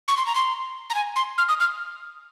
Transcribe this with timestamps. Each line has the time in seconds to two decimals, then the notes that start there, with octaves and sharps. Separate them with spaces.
0.08 C#6
0.17 C6
0.26 A#5
0.35 C6
0.90 A#5
0.95 G#5
1.16 C6
1.38 F6
1.49 D#6
1.60 F6